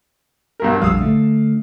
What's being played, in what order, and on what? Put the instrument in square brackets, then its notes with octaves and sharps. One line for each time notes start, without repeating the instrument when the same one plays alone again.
[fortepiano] B1 G2 A#4
[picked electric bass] A#1 F2 G3 [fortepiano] F5 D#6 E6
[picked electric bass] D3 A3